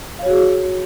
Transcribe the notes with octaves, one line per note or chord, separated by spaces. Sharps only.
F#4 G#4 C#5 F5